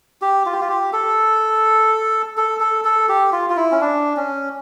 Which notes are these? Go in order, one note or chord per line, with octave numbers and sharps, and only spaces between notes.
G4
F4
G4
F4
G4
A4
A4
A4
A4
G4
F4
F4
E4
C#4
D4
C#4